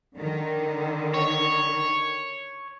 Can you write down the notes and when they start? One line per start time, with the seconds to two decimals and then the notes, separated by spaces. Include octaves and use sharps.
0.16 D3 D#3
1.14 C#5